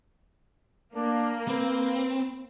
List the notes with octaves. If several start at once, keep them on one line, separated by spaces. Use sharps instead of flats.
A#3 D4
C4 B4